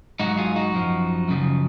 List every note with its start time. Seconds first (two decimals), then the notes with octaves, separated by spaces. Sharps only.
0.20 G#2 F#3 D#4 F#4
0.38 F4 G#4
0.56 D#4 F#4
0.74 F#2 F3
1.28 F#2 C#3 F3